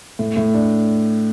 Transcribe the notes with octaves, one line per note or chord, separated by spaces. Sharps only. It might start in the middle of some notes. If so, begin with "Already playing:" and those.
A2
A2
D4